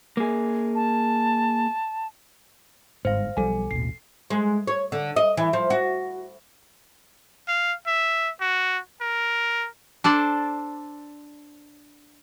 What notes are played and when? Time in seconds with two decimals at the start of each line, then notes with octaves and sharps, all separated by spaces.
0.17 A#3 G#4
0.75 A5
3.05 G1 G#2 C5 F5
3.37 B1 F3 G3 A4 G#5
3.71 A1 D#2 B2 C7
4.30 G#3
4.67 C#5
4.92 D3
5.16 D#5
5.37 E3
5.53 F3
5.70 F#4
7.48 F5
7.87 E5
8.41 F#4
9.01 A#4
10.04 D4 A4 C5 D5